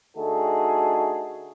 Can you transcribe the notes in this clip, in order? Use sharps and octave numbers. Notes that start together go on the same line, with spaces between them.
D3 A3 D#4 F#4 G#4 A4